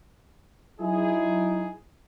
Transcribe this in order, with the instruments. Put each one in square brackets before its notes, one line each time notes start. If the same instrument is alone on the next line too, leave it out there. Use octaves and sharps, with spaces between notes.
[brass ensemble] F#3 D#4 E4 G#4